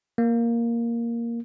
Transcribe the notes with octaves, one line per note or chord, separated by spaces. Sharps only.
A#3